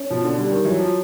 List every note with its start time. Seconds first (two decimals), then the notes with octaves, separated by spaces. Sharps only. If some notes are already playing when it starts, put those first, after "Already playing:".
Already playing: C#4
0.10 B2 F3
0.24 D3
0.38 D3 G3
0.51 D#3
0.65 E3 F#3
0.78 F3